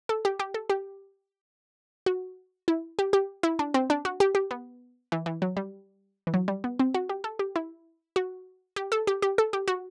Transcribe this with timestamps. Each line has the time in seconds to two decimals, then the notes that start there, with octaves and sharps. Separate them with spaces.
0.09 A4
0.25 G4
0.39 G4
0.54 A4
0.70 G4
2.06 F#4
2.68 E4
2.99 G4
3.13 G4
3.43 E4
3.59 D4
3.74 C4
3.90 D4
4.05 F#4
4.20 G4
4.35 G4
4.51 B3
5.12 E3
5.26 E3
5.42 F#3
5.57 G3
6.27 E3
6.34 F#3
6.48 G3
6.64 B3
6.79 C4
6.94 F#4
7.09 G4
7.24 A4
7.39 G4
7.56 E4
8.16 F#4
8.76 G4
8.92 A4
9.07 G4
9.22 G4
9.38 A4
9.53 G4
9.68 F#4